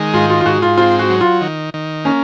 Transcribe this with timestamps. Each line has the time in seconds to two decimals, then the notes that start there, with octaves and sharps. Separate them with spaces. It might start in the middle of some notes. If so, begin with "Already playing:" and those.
Already playing: D#3 G#3
0.13 G#2 F4
0.30 F4
0.41 F4
0.46 G#2 F#4
0.62 F4
0.77 C4 F4
0.99 F#4
1.10 F#3
1.21 F4
1.41 D#3
1.74 D#3
2.05 A#3 C#4